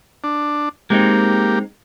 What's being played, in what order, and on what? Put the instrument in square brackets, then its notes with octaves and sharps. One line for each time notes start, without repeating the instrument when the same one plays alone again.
[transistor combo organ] D4
[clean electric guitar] G#3 C4 D#4 [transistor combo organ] A#3 G4